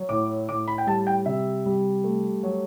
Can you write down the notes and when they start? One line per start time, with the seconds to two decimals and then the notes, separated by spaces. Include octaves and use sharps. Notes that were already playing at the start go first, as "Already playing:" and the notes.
Already playing: F#3
0.09 A2 D6
0.49 A2 D6
0.68 B5
0.78 G5
0.86 G3 A5
1.07 G5
1.26 C3 E5
1.66 G3
2.04 A3
2.43 F#3